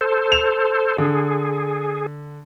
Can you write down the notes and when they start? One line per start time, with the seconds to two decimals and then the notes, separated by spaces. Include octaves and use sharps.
0.01 A4 C5
0.32 E7 F7
0.98 D3 G#4